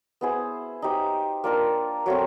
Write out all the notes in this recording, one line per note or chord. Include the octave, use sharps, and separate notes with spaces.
B3 E4 G#4 C5
D#4 G4 C5
A#3 D4 F4 A#4
F#3 A3 C4